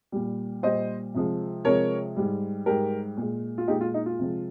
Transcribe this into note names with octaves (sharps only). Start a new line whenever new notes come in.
A#2 G3
A#2 G3 C5 D#5
C3 F3 G#3
C3 F3 G#3 A#4 C#5
G#2 G3
G#2 G3 G4 A#4
A#2 G#3
F4
A#2 G#3 D#4 G4
F4
D#4
F4
C3 F3 G#3